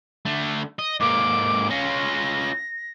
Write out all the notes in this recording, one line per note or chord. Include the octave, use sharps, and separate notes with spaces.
D3 A3
D#5
G#2 A#3 D6
C#4 F4 A#6